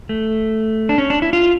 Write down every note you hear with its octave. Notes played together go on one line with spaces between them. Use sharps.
A3
D4
C#4
D4
E4
F4